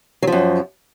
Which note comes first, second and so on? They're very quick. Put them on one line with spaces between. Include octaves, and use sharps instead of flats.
F#3 F3 F#2